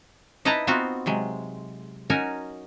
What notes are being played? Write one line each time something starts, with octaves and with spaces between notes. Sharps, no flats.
D#4 E4 B4 D#5 A5 A#5
B3 C4 D#4 F4 F#4
C3 F#3 G#3
C#4 D#4 F#4 A#4 G#5